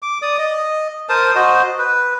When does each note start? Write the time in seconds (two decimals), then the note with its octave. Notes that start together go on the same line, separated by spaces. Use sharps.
0.02 D6
0.22 D5 D#6
0.38 D#5
1.09 A#4 C5 A5 D#6
1.35 F#4 C5 D#5
1.79 B4